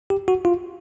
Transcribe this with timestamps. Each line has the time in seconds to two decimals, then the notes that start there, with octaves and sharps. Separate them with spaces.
0.10 G4
0.28 F#4
0.45 F4